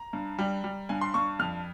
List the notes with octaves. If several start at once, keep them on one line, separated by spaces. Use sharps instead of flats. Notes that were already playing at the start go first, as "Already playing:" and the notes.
Already playing: A#5
G2
G3
G3
G2 G#5
C6
G2 C#6
F2 F6